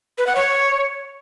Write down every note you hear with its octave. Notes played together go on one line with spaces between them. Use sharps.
B4
F#5
C#5